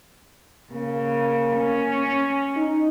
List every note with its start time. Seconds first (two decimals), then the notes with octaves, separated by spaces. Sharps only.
0.72 C#3 A#3
1.56 C#4
2.57 D#4